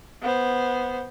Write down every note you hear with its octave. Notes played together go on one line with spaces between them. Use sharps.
B3 C5